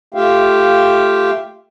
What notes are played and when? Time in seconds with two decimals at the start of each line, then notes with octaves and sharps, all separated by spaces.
0.14 A3 F4 G4 E5 F5 G5